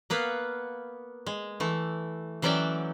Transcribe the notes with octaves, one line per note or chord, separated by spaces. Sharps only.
A#3 B3 B4 F5
G#3
E3 A3
E3 F#3 C#4 D5 E5 G5